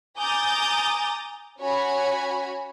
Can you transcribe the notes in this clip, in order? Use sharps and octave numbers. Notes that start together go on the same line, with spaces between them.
G#5 A#5 D6 D#6 G6 A6
C#4 F#4 C#5 G#5 B5